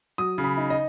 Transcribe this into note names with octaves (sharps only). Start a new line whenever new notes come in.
F#3 D#6
C#3
B5
D#4
D#5